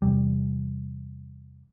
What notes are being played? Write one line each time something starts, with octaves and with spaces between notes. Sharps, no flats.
E2 C3 G3